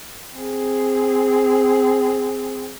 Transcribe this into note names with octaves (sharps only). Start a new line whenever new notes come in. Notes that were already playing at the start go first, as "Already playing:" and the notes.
C4 G#4